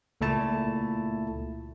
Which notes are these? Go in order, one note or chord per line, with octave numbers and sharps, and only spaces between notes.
C#2 A#2 A3 E4 A5